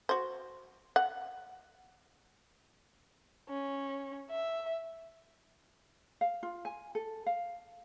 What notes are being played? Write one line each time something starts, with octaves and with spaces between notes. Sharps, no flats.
F#4 C5
F#5
C#4
E5
F5
F4
G#5
A4
F5